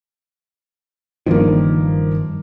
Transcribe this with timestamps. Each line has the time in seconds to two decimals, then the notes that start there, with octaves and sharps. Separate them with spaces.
1.26 F#1 G2 D#3 F3 A#3